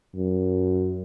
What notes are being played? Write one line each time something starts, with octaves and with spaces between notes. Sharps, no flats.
F#2